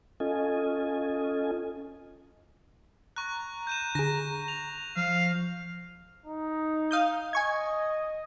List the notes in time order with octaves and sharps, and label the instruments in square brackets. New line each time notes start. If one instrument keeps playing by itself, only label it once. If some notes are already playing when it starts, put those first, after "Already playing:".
[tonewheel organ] C#4 F4 A4 D#5 G#5
[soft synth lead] A#5 [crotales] C#6 F#6
[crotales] G6 D#7 E7
[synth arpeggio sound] D3 G#4 [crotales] A#6
[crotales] F7
[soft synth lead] F3 [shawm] F5
[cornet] D#4
[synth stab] F5 D#6 G6
[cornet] D#5 [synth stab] G#5 C#6 G#6